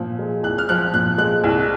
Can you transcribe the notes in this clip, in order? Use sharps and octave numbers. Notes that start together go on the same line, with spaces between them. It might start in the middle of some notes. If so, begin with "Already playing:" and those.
Already playing: A#2 F3
G#3
C2 F#6
F6
F3 F#6
A#2 F#6
G#3 F#6
C2